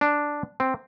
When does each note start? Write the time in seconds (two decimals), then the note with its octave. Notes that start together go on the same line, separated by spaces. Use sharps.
0.01 D4
0.60 C4